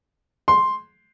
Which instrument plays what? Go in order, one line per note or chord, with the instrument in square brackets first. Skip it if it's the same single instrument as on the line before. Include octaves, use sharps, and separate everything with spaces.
[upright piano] C6